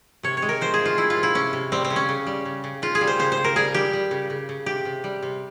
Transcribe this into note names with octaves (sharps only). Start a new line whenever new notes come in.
C3 C#5
C#5
G#3
A#4
F3 C5
G#4
C3
F4
F3 E4
F4
C3
E4
C3 C#4
C3
G3 C4
C4
C#3
C#4
C#3
G3
C#3
C#3
C#3 F4
G#4
G3
C5
C#3 C5
C5
C#3
A#4
G3 G#4
G3 G4
G3
C#3
C#3
C#3
C3 G4
C3
G3
C3